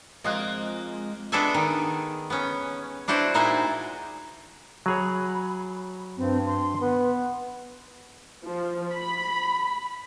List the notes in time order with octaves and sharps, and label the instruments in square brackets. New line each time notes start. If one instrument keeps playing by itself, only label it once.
[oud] F3 C4 F5 [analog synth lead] G#3 [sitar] A#3 [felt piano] D#5 D#6 F#6
[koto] G#3 B3 D4 A4 E5 G#5
D#3
B3 C#4
D4 E4 F#4 C5 D5
A#2 G#3 D#4 E4 C5 G#5
[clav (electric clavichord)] F#3 G#4 C#5 [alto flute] B5
[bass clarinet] G2 [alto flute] C4
[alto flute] C6
[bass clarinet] B3 [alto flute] B4
[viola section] F3
B5